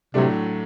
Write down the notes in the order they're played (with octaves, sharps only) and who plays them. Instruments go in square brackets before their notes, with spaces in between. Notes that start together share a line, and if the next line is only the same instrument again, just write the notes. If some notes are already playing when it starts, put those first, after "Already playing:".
[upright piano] A2 F#3 A3 D4 [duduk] C3